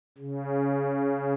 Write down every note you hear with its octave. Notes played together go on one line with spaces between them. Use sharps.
C#3